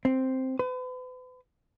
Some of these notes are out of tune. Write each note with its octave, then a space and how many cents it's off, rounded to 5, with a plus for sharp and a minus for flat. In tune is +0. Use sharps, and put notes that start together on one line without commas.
C4 +0
B4 +40